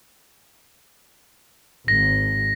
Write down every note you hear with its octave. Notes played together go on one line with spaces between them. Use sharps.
G#1 A#6